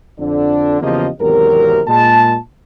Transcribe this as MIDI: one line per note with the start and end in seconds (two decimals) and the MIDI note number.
0.19 0.81 41
0.19 0.81 50
0.19 0.81 62
0.81 1.08 40
0.81 1.08 49
0.81 1.08 53
0.81 1.08 58
0.81 1.08 67
0.81 1.08 75
1.20 1.82 32
1.20 1.82 40
1.20 1.82 48
1.20 1.82 54
1.20 1.82 67
1.20 1.82 70
1.88 2.36 46
1.88 2.36 56
1.88 2.36 81